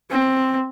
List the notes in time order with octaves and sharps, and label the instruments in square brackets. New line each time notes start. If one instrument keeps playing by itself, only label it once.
[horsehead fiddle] C4